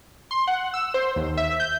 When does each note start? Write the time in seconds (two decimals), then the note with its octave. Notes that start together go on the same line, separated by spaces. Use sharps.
0.31 C6
0.47 F#5
0.74 E6
0.94 C5
1.16 D#2
1.37 E5
1.60 G6